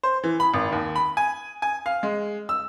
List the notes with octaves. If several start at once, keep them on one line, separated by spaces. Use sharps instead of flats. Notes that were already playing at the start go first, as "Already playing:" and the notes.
C5
E3
B5
G#1
D#2
B5
G#5
G#5
F5
G#3
E6